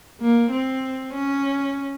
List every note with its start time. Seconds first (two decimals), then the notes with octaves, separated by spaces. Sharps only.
0.20 A#3
0.51 C4
1.13 C#4